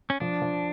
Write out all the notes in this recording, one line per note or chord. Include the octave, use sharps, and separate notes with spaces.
C#4
F3 D4
F3